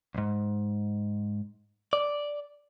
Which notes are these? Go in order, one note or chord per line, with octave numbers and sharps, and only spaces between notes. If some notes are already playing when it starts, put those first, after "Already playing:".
C2 G#2
D5